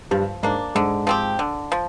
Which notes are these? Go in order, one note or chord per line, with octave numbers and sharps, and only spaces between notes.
G2 F3 G3
G#2 G#3 A#3 D4
G#2 D3 G#3
F3 C4 G4
D3
F3